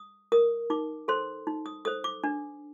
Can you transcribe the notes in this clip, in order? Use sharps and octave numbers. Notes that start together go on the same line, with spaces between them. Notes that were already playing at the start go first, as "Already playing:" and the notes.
Already playing: D#6
A#4 D#6
D#4 D6
A4 C5 C6
D#4
D#6
A4 C5 D#6
D6
D4